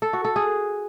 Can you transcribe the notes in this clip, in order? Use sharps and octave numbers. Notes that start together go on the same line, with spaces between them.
A4
F#4
A4
G#4